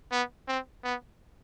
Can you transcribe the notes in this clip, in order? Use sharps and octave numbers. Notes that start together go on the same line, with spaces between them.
B3
C4
B3